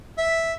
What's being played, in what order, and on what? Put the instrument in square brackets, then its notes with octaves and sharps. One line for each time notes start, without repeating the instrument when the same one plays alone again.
[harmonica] E5